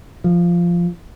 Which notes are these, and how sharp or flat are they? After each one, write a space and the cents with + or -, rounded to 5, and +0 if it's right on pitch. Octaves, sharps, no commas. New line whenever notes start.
F3 -10